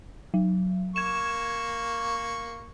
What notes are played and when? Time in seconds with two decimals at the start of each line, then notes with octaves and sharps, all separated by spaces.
0.34 F#3
0.96 A#3 C#6 G#6 E7